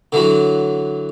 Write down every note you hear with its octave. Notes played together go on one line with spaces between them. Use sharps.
D3 E3 F#3